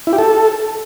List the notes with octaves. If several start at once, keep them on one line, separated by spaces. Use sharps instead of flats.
E4
G4
A4